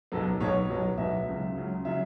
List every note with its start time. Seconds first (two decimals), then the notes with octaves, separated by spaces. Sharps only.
0.12 B1 B2 F#3 B3 A4
0.40 B1 B2 F#3 B3 C#5
0.69 B1 B2 F#3 B3
0.97 B1 B2 F#3 B3 E5
1.27 C#2 C#3 F#3
1.55 C#2 C#3 F#3
1.85 C#3 F#3 E5